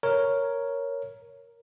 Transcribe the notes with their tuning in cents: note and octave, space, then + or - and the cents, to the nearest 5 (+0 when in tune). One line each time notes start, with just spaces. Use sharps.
A#4 +0 C#5 +0